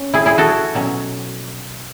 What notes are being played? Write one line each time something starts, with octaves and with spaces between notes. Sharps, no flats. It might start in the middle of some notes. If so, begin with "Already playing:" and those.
Already playing: C#4
E4 G#4
E4 G#4
F#4 A4
B2 F#3 C#4